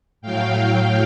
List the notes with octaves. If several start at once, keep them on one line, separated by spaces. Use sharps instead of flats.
A2 F#3 F5 G5